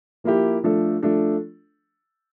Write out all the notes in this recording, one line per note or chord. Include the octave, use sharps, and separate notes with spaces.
F3 A#3 E4 G4
F3 A3 D4 A4
F3 A3 D4 A4